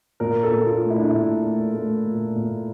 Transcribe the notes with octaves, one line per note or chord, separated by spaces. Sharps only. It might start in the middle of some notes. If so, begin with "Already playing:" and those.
A#2 A#4
A4
A#2
F4
A3
E4
D4
E4
A#2
A3
A3
A#2
A#2